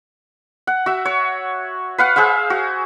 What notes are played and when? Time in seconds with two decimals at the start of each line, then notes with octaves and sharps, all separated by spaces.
0.67 F#5
0.86 F#4 E5
1.05 C#5
1.98 B4 F5 F#5
2.16 G#4 C5 E5 F5
2.50 F#4